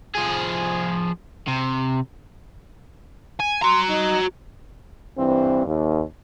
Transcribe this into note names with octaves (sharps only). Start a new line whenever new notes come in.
F3 G#4
C3
G#5
F#4 A#5 C6
D#4
G2 E3 C4
D#2